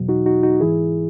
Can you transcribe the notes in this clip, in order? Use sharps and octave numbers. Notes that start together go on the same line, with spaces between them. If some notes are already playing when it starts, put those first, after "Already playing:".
Already playing: E2 B2 F#3
D#4 F#4
D#4 F#4
D#4 F#4
G#2 E3 E4 G#4